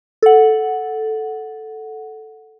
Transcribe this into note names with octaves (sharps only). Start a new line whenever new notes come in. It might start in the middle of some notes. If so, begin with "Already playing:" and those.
A4 F#5